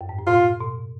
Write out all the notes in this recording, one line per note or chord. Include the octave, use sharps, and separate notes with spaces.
F#2
G#2
A2
B2 F4
B2